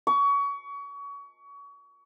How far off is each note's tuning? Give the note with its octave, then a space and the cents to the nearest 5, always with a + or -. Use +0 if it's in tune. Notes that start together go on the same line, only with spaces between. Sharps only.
C#6 +30